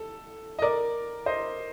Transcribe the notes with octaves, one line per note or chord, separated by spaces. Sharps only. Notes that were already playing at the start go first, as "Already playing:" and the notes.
Already playing: A4
D#5
A#4 D5
C5 D#5